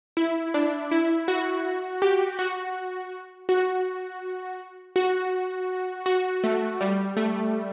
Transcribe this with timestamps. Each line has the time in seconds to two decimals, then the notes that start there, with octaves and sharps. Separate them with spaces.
0.17 E4
0.54 D4
0.91 E4
1.28 F#4
2.02 G4
2.39 F#4
3.49 F#4
4.96 F#4
6.06 F#4
6.44 A3
6.81 G3
7.17 A3